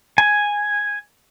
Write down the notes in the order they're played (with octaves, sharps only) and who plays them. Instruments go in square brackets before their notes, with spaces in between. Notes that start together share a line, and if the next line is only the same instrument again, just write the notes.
[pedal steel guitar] G#5